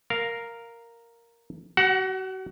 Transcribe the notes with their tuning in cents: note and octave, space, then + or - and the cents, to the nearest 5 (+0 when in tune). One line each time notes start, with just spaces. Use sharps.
A#4 +0 F5 +0
F#4 +35 F#5 +0